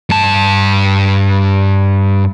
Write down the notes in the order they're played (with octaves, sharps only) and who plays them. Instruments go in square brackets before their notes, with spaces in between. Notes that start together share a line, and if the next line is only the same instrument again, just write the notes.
[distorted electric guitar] G2 A5